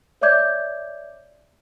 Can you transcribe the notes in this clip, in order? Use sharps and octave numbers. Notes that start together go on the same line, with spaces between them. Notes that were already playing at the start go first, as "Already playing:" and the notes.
C#5 D5 E5 D6 G6 G#6